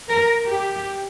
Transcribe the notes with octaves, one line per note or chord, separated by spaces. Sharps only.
A#4
G4